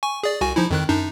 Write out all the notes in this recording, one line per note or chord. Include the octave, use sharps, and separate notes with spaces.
G#5 C#6
G#4 D5
C2 F#4 G#5
F3 D#4 E4
F2 D#3 F#6
F#2 D4 D#4